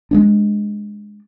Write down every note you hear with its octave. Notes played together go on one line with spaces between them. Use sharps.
G#3 B3 D4